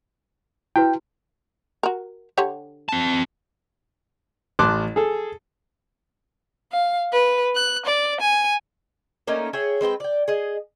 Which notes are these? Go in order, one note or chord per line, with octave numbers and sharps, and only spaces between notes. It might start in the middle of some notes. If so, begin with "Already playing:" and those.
E4 F#4 B4 G5
F#4 A#4
D3 G4 C#5
C4 A5
A1 A5 C6 D6 F#6
G#4 A4
F5
B4
F#6
D5
G#5
A3 A#3 C#4 D#4
G#4 C#5 E5 G5
G#3 C4 B4 G5
D5 G5
G#4 D#5